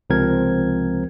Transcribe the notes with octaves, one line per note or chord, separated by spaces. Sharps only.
C#2 C3 F3 C4 A#4 G#6